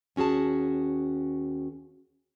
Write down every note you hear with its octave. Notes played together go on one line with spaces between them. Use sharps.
D#2 C#4 F#4 G#4 A5